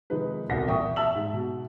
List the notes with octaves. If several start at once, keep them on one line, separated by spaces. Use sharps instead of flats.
C3 D#3 F3 G#3 D#4 B4
D#1 C2 B2 F#5 A#6
E2 A#2 E5 G5 C#6 D#6
E5 A5 E6 F#7
G#2
B2